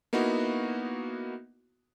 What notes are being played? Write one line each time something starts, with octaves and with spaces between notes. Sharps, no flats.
A#3 B3 D#4 E4 F#4